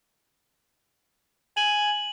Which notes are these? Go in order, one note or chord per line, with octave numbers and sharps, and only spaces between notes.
G#5 F#7